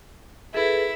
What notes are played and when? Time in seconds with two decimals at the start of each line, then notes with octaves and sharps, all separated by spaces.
0.54 E4 G#4 A4 B4